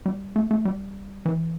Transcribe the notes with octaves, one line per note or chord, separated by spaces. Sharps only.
G3
A3
A3
G3
E3